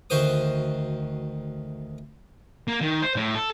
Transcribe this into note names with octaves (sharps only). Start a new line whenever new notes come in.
D2 D#3 F#4 C5 D#6
A#3
D#3
C5
A2
A4